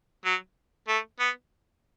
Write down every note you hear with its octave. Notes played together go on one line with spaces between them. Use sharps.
F#3
A3
B3